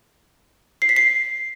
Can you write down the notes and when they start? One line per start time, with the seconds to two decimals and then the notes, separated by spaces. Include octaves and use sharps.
0.82 C7
0.89 B6
0.96 C7